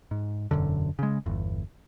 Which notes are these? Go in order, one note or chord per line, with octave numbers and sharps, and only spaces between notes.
G#2
E1 F#2 D3
C#3 G#3
G1 E2